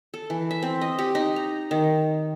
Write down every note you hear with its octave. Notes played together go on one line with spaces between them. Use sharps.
A4
E3
E5
C4
D#5
G4
D#4
A#5
D#3